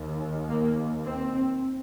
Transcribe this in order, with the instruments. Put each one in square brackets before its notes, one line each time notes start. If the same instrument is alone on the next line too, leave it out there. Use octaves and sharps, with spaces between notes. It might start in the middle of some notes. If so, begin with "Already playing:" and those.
Already playing: [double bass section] D#2
A#3
C4